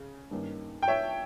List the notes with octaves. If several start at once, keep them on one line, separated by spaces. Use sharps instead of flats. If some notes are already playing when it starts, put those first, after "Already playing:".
Already playing: C#3
G2 D#3 A#3 C#4
G5
C#5 E5